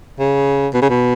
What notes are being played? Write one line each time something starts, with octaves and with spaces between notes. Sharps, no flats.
C#3
B2
C#3
B2